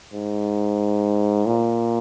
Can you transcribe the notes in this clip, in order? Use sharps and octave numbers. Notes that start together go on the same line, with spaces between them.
G#2
A#2